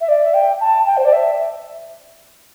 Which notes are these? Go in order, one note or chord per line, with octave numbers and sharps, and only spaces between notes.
E5
D5
E5
G5
A5
G5
C5
D5
E5